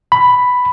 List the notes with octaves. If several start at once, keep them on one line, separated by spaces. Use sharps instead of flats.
B5